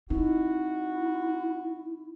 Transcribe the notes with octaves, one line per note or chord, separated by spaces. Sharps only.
C4 D#4 E4 F#4